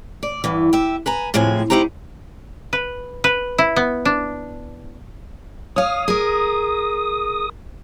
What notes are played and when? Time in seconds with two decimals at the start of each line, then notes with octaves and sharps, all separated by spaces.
0.23 D5
0.44 E2 G2 E3
0.73 G4 E5
1.06 B4 G#5 A#5
1.34 A2 C3 F3 G#3 C4 G#5
1.70 D2 D#4 E4 G4 C5 A#5
2.73 B4
3.24 B4
3.58 E4
3.76 B3
4.05 D4
5.76 C#5 F5 D#6
6.08 G#4 A#4